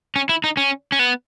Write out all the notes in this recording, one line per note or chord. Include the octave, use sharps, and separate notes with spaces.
C#4
E4
D#4
C#4
C#4
B3